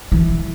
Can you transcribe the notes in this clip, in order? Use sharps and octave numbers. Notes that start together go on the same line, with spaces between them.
E3